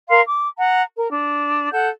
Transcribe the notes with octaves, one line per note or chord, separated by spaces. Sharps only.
A#4 F5 C6
D6
F#5 A#5
A#4
D4
A4 F#5 G6